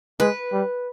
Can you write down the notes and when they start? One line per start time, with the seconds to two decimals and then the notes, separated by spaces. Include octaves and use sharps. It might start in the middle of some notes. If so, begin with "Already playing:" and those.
0.19 G#3 B4
0.52 G3